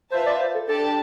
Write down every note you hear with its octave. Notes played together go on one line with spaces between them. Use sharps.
F4 B4 C5 E5 A5
D5
C5
A4
D4 G4 A4 D5 A5